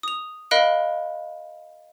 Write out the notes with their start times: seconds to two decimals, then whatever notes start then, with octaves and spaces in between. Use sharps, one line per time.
0.03 D#6 F7
0.51 A#4 D#5 F5 B5 F#6 D7